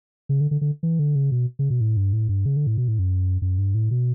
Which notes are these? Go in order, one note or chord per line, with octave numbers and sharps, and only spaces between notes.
C#3
D3
D3
D3
E3
D3
C#3
B2
C#3
B2
A2
G2
A2
G2
C#3
D3
A2
B2
A2
F#2
F#2
G2
A2
B2